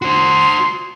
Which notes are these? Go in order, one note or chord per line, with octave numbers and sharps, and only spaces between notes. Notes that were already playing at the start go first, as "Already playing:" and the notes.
F#4 C5 C6